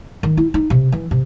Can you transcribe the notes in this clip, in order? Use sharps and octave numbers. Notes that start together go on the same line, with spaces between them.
D#3
E4
D#4
C3
E3
C3